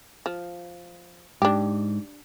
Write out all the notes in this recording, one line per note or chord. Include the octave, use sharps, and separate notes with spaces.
F3
G#2 D4 G4